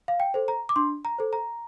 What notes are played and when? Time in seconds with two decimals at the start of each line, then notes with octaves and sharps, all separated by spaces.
0.08 F5
0.20 G5
0.34 A4 C5
0.48 A#5
0.69 D6
0.76 D4 C6
1.05 A#5
1.19 A4 C5
1.33 A#5